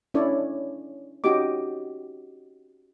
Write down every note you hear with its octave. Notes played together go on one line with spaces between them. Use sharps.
C#4 D4 E4 A4 C#5 D5
C#4 D#4 F#4 G4 D#5 D6